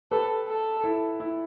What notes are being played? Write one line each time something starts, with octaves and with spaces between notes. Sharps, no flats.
G4 A4 B4
A4
E4 A4
E4